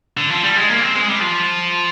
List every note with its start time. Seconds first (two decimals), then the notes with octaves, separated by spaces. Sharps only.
0.17 D3
0.30 F3
0.44 G3
0.56 G#3
0.69 A#3
0.82 C4
0.95 G#3
1.09 G3
1.21 F3